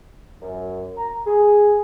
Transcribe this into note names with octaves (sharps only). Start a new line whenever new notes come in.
F#2
A#5
G#4